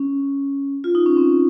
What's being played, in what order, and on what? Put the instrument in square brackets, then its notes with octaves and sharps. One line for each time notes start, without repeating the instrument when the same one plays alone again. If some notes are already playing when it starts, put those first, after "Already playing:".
Already playing: [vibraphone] C#4
F4
D#4
C#4
C4